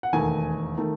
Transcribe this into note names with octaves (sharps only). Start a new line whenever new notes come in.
F#5
E1 D#2 D#3 A3 G#5
D#3 A3